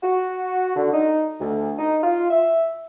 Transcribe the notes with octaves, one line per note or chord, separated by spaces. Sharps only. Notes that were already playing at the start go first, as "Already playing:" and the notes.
F#4
D3
D#4
D2
D#4
F4
E5